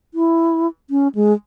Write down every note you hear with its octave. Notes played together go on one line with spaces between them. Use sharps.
E4
C#4
G#3